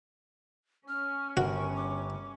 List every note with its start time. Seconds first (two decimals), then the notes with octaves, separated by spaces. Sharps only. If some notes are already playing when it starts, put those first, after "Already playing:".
0.88 C#4 F6
1.37 G1 F#4 A#4
1.76 D6